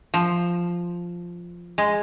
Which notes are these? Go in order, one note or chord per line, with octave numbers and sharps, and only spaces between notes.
F3
G#3